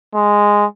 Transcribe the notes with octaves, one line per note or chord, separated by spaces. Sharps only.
G#3